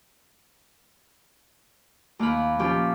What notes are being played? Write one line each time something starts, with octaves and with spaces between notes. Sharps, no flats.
D#2 A#3 A#4 B5
A#2 F3 A#3 C#4 G4